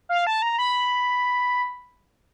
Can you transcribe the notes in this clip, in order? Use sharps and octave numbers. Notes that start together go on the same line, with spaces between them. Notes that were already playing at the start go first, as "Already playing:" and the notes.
F5
A5
A#5
B5